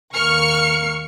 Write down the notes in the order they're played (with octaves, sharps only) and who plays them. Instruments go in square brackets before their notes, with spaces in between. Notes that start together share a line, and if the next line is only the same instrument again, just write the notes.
[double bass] D#2 A#3 [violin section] C#6 F6 C#7